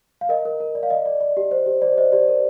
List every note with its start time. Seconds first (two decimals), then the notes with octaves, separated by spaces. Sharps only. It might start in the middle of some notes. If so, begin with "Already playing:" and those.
0.21 F5
0.29 A#4 D#5
0.45 A#4
0.60 A#4
0.75 D5
0.83 F5
0.90 D5 D#5
1.06 D5
1.21 D5
1.37 G4
1.51 C5
1.66 G4
1.82 C5 D5
1.98 C5 D#5
2.12 G4 D5
2.28 A#4